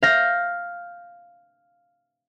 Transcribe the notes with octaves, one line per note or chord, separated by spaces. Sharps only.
F5 G6 A#6